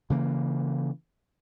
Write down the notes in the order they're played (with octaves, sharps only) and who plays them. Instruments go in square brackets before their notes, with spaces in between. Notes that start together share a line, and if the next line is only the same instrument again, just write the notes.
[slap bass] C#3 E3 A#3